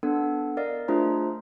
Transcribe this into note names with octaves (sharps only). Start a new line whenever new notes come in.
B3 D4 A4 F#5
A#4 D5 D#5 F5
A3 D4 F4 G#4 C5 A#5